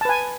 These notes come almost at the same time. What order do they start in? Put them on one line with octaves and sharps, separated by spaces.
A5 B4 G#5